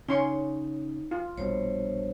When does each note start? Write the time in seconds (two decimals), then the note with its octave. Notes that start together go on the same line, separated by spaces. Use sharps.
0.09 C#3 C#4 D#4 C6 C#6
1.11 F4
1.38 A#1 G2 B2 C5 C#5